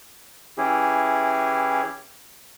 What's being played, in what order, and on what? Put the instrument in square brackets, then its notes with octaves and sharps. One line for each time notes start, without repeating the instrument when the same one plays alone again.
[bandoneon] E3 C#4 E4 G4 G#4